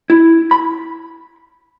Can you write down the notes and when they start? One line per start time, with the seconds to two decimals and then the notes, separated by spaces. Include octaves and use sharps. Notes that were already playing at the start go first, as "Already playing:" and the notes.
0.10 E4
0.51 B5